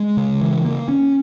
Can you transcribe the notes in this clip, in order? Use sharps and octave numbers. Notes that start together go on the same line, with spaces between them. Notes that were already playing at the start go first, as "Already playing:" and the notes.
Already playing: G#3
C#3
E3
A#3
C#4